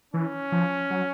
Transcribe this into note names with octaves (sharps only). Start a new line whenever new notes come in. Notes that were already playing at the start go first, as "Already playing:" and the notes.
E3 C#4
F3
F#3